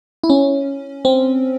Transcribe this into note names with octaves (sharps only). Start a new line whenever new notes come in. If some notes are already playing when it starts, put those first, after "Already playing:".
E4
C#4
C4